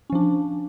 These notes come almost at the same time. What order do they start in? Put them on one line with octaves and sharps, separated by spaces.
C#4 F3 D4